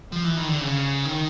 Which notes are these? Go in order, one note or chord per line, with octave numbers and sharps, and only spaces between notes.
F3
E3
D#3
D3
C#3
D#3